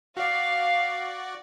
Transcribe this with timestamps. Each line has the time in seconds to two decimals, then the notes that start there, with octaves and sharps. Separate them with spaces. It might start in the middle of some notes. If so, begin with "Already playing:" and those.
0.17 F#4 D5 F5